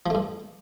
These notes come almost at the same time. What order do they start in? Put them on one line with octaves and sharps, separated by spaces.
F3 A3 G2